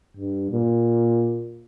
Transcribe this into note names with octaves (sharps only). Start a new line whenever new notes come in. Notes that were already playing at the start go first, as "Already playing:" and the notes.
G2
A#2